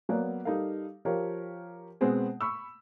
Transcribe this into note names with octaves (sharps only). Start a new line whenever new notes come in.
F#3 A#3 B3 D5
G3 D#4 A4 A#4 F5
F3 G4 A#4 C#5 F5
B2 G#3 B3 C4 G#4
B5 C#6 E6